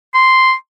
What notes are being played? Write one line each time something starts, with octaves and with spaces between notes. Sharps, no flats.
C6